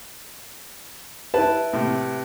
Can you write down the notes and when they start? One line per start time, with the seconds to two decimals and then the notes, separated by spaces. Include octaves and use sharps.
1.34 E4 B4 A5
1.73 A2 C3